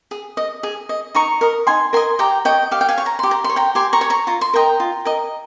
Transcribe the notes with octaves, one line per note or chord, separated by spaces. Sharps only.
G#4
D#5
G#4
D#5
D#4 A#5 C#6
A#4 D#5
D#4 G#5 C6
A#4 D#5 G#5 C6
G4 G5 A#5
C#5 D#5 G5
G4 F5
G5
F5 G#5
C#5
A#5
G4 C6
A#5
C6
C#5
G5 A#5
G4 G#5 C6
A#5 C#6
C#5
A#5 C#6
F4 A#5
C6
A#4 D#5 G5 A#5
F4
A#4 D#5